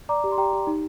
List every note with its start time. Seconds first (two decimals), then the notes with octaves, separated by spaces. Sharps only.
0.09 D5 A#5 D6
0.24 G4
0.32 C6
0.38 G4 G5 A#5
0.53 G4
0.67 D#4